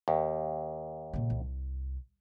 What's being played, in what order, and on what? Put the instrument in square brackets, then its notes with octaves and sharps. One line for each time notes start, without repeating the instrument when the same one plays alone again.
[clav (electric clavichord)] D#2
[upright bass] A#2 C#3
C2